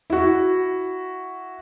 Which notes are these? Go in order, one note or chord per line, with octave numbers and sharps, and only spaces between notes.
E4 F#4